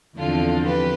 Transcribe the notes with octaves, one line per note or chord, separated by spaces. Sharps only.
E2 D3 F3 C4 F4 A4
G4 B4